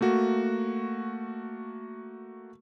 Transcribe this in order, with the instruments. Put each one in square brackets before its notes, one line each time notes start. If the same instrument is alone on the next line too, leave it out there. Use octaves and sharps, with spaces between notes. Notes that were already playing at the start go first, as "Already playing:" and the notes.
[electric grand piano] A3 A#3 F#4